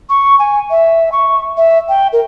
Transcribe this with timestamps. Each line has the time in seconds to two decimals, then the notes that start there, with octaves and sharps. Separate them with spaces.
0.10 C#6
0.39 G#5
0.71 E5
1.12 C#6
1.57 E5
1.89 G5
2.13 A#4